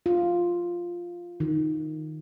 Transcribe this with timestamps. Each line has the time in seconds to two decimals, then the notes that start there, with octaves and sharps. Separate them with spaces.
0.06 F4
1.40 D#3